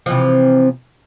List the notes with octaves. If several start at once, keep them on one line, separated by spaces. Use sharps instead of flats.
C3 E3 F3